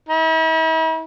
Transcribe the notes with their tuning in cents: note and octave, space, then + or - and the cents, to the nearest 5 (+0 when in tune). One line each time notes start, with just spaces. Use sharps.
E4 -45